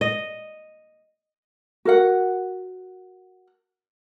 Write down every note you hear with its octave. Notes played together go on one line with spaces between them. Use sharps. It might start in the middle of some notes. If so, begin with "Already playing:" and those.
D#5
F#4 A#4 F#5